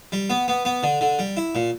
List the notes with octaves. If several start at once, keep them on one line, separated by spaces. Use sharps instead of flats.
G3
B3
B3
B3
D3
D3
G3
E4
A#2